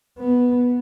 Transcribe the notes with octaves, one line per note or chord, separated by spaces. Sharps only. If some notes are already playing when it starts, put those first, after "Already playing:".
B3